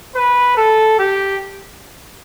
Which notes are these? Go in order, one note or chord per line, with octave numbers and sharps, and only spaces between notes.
B4
A4
G4